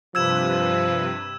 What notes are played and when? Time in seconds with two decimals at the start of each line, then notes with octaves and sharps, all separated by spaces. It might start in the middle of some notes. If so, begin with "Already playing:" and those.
0.15 G2 C3 F3 B4 E6 G#6 E7